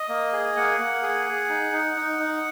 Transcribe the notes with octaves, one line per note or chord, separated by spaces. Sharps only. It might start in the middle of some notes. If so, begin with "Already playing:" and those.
Already playing: D#5
A#3
G#4
A#3 F#5
A#3
G#4
G#4
D#4
D#4
D#4
D#4